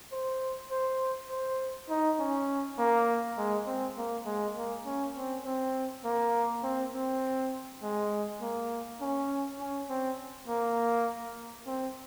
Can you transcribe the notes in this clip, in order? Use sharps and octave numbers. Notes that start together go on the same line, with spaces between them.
C5
C5
C5
D#4
C#4
A#3
G#3
C4
A#3
G#3
A#3
C#4
C4
C4
A#3
C4
C4
G#3
A#3
C#4
C#4
C4
A#3
C4